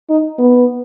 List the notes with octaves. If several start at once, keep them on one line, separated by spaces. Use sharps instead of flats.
D#4
B3